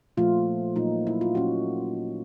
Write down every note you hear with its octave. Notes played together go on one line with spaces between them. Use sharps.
A#2 F3 A3 F4
A#2 F#3 A#3 D#4
E4
F4
A#2 F#3 A#3 C#4 E4 F#4